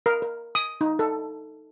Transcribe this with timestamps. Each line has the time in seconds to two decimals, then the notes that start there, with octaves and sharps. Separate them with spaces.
0.06 A#4
0.22 A#4
0.55 D#6
0.81 D#4
0.99 A4